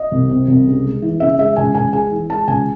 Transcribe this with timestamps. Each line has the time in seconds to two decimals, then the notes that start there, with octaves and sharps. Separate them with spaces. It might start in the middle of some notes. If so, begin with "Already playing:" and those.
Already playing: D#5
0.11 C2
0.29 C3
0.48 C2
0.66 C#3
0.84 G#3
1.02 E3
1.20 C#3 E5
1.38 G#3 E5
1.56 C#2 G#5
1.74 C#2 G#5
1.93 G#3 G#5
2.11 E3
2.30 G#3 A5
2.48 C#2 G#5